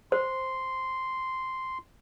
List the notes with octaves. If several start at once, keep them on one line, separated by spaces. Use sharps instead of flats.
C5 C6